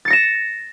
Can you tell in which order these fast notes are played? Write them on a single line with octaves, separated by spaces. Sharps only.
A6 C#7 A#6 E7